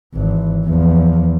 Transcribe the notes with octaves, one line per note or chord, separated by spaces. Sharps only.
G#1 E3
E2 F3